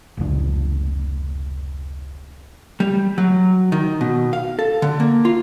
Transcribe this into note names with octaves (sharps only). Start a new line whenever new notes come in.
F1 C#2 D4
G3
F#3
D#3
B2
F5
A4
D3
A#3
F4